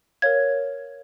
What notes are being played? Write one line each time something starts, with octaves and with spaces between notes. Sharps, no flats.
A#4 C#5 F5 G#6